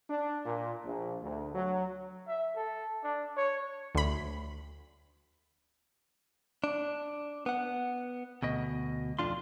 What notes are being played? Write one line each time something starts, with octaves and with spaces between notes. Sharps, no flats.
D4
A#2
A#1
D2
F#3
E5
A4
D4
C#5
D2 B5
D4
B3 F#5
D2 B2 D#5
F2 D4 F4 C6